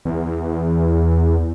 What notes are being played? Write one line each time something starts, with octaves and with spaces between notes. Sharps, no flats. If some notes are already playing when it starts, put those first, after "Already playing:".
E2